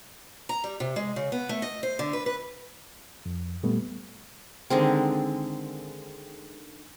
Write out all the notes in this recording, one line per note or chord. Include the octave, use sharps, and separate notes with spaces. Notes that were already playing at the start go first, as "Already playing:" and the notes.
A#5
G3
C3
G#3
C#3
B3
A3
D#5
C5
D3
B4
B4
F2
A#2 G3 A3 B3
D3 D#3 G#3 C4